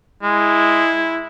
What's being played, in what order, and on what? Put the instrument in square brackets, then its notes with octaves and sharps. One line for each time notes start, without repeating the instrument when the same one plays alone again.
[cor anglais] G#3 [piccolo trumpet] E4